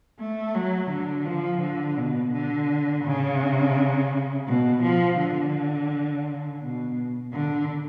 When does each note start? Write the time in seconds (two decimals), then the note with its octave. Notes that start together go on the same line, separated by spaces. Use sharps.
0.19 A3
0.55 F#3
0.91 D3
1.26 F3
1.62 D3
1.98 B2
2.33 D3
3.05 C#3
4.47 B2
4.83 F3
5.19 D3
6.62 B2
7.33 D3